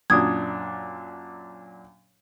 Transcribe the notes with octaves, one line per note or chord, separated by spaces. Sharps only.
F#2 A#2 D4 D#6 G#6